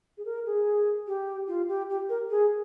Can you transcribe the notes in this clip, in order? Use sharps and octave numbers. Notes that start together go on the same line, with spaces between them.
G#4
A#4
G#4
G4
F4
G4
G4
A#4
G#4